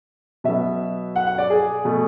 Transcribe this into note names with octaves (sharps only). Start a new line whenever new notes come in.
B2 F#3 B3 E5
F#5
F#5
D5
G#4
B2 A3